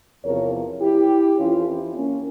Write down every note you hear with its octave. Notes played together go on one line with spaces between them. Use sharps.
E2 C3 F3 A#4 C#5
E4 G4
F2 E3 C#4 F4
C4 E4
A#3 C#4